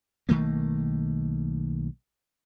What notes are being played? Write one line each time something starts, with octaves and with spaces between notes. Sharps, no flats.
B1 D#3 A3 A#3